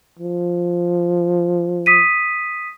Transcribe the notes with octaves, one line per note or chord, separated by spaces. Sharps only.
F3
D#6 B6 D#7